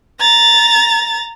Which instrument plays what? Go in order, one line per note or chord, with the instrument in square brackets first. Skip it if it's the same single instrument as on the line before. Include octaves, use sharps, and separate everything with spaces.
[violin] A#5 A6